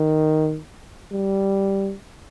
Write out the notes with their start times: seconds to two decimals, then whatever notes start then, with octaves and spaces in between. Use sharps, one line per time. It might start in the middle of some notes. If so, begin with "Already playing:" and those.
Already playing: D#3
1.12 G3